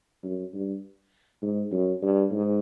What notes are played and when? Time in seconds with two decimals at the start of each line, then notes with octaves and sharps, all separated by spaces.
0.23 F#2
0.54 G2
1.42 G#2
1.72 F#2
2.02 G2
2.31 G#2